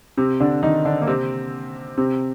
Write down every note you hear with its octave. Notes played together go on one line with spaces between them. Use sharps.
C3 C4
D3 D4
D#3 D#4
D3 D4
A#3
C3 C4
C3 C4